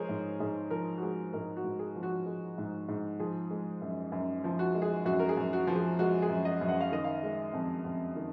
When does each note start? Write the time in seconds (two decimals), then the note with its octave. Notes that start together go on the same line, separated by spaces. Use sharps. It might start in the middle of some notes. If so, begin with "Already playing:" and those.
Already playing: F3 G#3 G#4 A#4 C5 C#5
0.09 G#2
0.40 G#2 G#4
0.71 F3 A#4
0.97 F#4
1.02 G#3 G#4
1.33 G#2 A#4
1.57 F#4
1.64 G#2
1.79 G#4
1.96 F3
2.03 F#4
2.26 G#3
2.58 G#2
2.88 G#2
3.20 F3 G#4
3.51 G#3
3.82 F#2
4.12 F#2
4.44 F3
4.59 F#4
4.75 G#3
4.82 G#4
5.05 F#2 F#4
5.19 A#4
5.29 G#4
5.37 F#2
5.53 F#4
5.67 F3
5.75 G#4
5.99 G#3 F#4
6.22 G#4
6.29 F#2
6.45 D#5
6.61 F#2
6.69 F#5
6.81 F5
6.92 D#3 D#5
7.04 F5
7.23 G#3
7.53 F2
7.85 F2
8.16 D#3